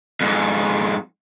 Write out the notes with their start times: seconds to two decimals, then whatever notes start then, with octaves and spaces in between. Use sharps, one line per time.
0.21 F2 G#2